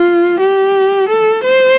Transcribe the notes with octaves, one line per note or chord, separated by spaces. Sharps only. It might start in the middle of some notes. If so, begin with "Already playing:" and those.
Already playing: F4
G4
A4
C5